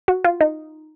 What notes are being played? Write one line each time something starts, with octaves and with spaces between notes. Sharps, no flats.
F#4
F4
D#4